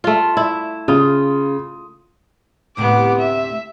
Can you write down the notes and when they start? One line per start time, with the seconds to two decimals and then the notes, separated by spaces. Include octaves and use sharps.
0.04 A3 F4
0.37 E4
0.88 C#3 F4 D#6
2.77 D2 A2 C3 B3 D6
3.18 E5